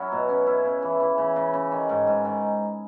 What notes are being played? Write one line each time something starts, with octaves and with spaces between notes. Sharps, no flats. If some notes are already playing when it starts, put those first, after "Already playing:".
Already playing: F#3 C#4 E4
B2
C#4
E4
C#3
E3
E3
C#3
C#3
C#3
D#3
G#2
G#2
D#3